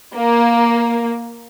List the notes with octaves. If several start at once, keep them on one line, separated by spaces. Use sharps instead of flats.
A#3